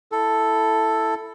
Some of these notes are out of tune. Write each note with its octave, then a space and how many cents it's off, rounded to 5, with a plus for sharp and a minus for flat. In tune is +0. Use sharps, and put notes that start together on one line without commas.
E4 +0 A4 +0